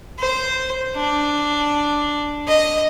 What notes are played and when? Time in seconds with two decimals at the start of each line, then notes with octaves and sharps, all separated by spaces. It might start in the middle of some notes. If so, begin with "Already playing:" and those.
0.19 C5
0.95 D4
2.48 D#5